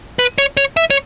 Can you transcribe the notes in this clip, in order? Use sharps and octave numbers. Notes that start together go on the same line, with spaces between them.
B4
C#5
C#5
E5
C#5